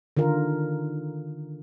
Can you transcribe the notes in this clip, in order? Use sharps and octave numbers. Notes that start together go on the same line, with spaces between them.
D3 D#3 F4 A#4